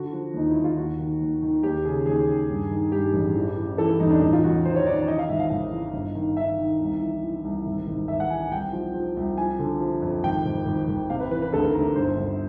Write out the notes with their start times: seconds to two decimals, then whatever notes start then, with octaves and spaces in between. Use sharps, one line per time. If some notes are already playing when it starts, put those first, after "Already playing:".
Already playing: D3 F#4
0.13 F3
0.34 D#2 D#4
0.50 E4
0.56 D#2
0.64 F4
0.77 D#2 F#4
0.99 D#3
1.21 D#2
1.42 D#3
1.63 D#2 G4
1.85 C#3 G#4
2.06 D#2 G#4
2.29 D#2
2.50 G2
2.71 D#3
2.92 G2 G4
3.14 A1
3.35 E3
3.57 E3
3.78 E3 A4
3.89 E4
4.00 E2 D#4
4.11 D4
4.21 A1 D#4
4.33 F4
4.44 A1 F#4
4.65 D#3 C5
4.76 C#5
4.86 D#3 D5
4.97 D5
5.08 E3 D#5
5.19 F5
5.29 G#1 E5
5.40 F5
5.50 G#1 F5
5.72 E3
5.93 G1
6.15 D#3
6.37 D#3 E5
6.58 D#3
6.80 C2
7.01 E3
7.23 E3
7.44 C2
7.66 G#1
7.87 G#1
8.08 G#1 E5
8.20 F#5
8.30 E3 G#5
8.41 G#5
8.51 C2 G5
8.73 F3
8.94 F3
9.17 C2
9.38 F3 G#5
9.59 D3
9.81 F3
10.02 F2
10.23 G#1 G5
10.46 G#1
10.66 G#1
10.88 G#1
11.10 C3 F5
11.20 B4
11.31 E3 B4
11.42 B4
11.53 D2 A4
11.64 A#4
11.74 D2 A#4
11.95 G1 C5
12.17 G1